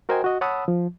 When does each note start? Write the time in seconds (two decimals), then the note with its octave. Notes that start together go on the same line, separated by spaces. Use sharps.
0.09 F#4 A#4 C5 D#5 G5 G#5
0.24 F#4 D#5
0.41 C#5 F#5 A5 B5 D#6 E6
0.68 F3